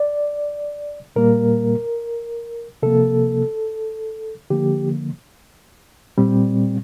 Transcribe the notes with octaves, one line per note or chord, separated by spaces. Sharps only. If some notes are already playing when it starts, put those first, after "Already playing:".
Already playing: D5
A#2 G3 A#3 A#4
C3 F3 A#3 A4
D3 F3 A#3 G4
A#2 G3 C4